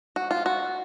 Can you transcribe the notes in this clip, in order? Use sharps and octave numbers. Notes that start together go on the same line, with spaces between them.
F#4
F4
F#4